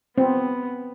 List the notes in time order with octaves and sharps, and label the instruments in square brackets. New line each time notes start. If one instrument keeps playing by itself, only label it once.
[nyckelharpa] B3 [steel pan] C4